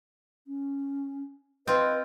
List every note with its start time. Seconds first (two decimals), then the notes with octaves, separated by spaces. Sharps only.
0.47 C#4
1.67 C4 F4 B4 D#5